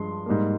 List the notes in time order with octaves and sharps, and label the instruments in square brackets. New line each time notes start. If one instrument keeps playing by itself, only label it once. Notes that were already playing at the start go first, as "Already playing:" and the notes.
Already playing: [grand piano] G2 F3 G#3 C6
G#2 G3 A#3